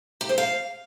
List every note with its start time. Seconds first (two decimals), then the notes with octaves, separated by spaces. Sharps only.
0.21 G4
0.29 C5
0.38 F5